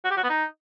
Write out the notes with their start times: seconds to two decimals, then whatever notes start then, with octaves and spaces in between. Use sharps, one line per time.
0.04 F#4
0.11 G4
0.17 F#4
0.23 B3
0.30 D#4